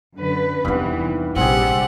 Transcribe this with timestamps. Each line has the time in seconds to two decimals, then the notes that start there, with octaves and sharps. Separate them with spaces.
0.16 F#2 D3 B4
0.65 E2 G2 C3 E3 D#4 F#5
1.36 A#1 C3 G3 C4 G4 G#4 F#5